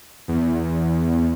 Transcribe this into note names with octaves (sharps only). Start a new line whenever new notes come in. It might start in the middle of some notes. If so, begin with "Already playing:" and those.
E2